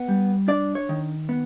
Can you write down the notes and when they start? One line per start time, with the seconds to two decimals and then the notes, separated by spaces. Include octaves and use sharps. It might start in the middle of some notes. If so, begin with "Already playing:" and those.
Already playing: B3
0.08 G3
0.48 D4 D5
0.75 C#5
0.89 D#3
1.29 B3